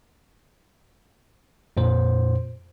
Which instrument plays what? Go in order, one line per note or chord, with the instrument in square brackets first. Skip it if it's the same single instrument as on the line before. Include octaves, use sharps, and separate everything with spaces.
[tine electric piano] F2 A#2 C5